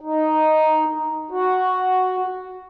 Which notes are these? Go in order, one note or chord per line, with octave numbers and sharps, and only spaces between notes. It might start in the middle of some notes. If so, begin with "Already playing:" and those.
D#4
F#4